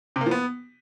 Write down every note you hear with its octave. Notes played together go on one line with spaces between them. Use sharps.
C3
A#3
F3
B3